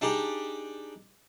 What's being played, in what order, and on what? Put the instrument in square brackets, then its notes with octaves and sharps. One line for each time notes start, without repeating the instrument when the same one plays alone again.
[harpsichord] D4 D#4 G4 G#4